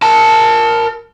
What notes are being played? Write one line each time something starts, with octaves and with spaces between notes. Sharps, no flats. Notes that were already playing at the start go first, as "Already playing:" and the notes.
A#4 A5